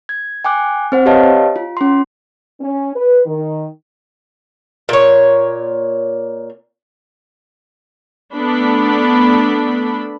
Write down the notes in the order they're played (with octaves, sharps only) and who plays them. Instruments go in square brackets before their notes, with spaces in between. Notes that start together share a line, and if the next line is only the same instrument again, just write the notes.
[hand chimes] G#6
G5 G#5 D6 F#6
C4 C5 F#5
G4 B4 C#5 D#5 F5 A5
F4
C#4 C6
[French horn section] C#4
B4
D#3
[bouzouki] A#2 C#5
[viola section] A3 B3 D4 B5